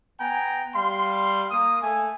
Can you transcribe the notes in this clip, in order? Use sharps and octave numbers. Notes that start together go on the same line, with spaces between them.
B3 G5 G#5 A#5
G3 F5 C6
A#3 D#6
A3 G#5